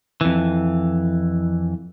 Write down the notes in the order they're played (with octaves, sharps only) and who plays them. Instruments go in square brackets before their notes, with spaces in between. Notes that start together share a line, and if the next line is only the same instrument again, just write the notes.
[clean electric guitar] F2 E3